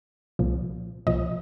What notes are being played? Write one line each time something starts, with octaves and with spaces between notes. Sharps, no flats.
C2 A#2 F3
C2 A#2 F3 D#5